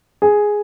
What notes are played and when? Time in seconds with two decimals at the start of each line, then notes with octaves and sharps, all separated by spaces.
0.22 G#4